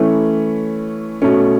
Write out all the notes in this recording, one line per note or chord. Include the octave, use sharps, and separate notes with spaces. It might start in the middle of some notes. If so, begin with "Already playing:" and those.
Already playing: E3 A3 C#4 E4
B2 A3 C#4